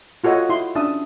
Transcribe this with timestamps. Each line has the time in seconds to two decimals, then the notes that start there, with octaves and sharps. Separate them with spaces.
0.24 F4 F#4 A4 C#5 D#5 F5
0.49 E4 C6
0.75 C#4 D4 E5 A5 D#6